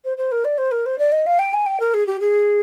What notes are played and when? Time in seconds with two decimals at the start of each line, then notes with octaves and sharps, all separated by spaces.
0.04 C5
0.17 C5
0.31 A#4
0.44 D5
0.58 C5
0.71 A#4
0.86 C5
0.98 D5
1.12 D#5
1.26 F5
1.39 G5
1.53 G#5
1.66 G5
1.80 A#4
1.94 G#4
2.06 G4
2.20 G#4